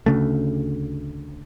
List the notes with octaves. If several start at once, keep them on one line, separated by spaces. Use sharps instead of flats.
D2 C#3 A3